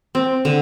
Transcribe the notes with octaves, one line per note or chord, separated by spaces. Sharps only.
C4
D3